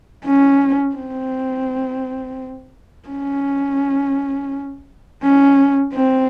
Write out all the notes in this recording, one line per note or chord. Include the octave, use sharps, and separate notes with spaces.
C#4
C4
C#4
C#4
C4